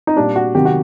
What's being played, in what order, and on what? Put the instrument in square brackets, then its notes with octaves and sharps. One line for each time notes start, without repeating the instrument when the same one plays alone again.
[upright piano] D#4
A#2 G3 D4
F#4
C3 D#3 F#3 G4
F#4